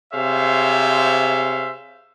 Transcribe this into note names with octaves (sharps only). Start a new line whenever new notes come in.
C3 G#4 C5 C#5 E5 F5